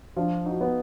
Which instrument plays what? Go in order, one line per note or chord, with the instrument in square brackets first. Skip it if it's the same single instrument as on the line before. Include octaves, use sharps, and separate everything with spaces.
[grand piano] F3 [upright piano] D4 F4
[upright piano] D#4 F#4
[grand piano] B3